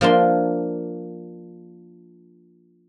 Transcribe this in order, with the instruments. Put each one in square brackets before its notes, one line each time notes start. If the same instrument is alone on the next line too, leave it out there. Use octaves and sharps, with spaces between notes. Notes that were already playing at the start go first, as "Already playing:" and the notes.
[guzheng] F3 A#3 D4 C6